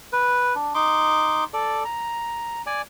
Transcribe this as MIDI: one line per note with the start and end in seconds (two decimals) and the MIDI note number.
0.13 0.55 71
0.55 0.73 62
0.75 1.44 63
0.75 1.44 84
0.75 1.44 86
1.53 1.84 69
1.53 1.84 74
1.85 2.62 82
2.66 2.82 74
2.66 2.82 80